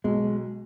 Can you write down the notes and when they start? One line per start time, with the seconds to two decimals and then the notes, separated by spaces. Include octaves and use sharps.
0.04 B1 B2 G#3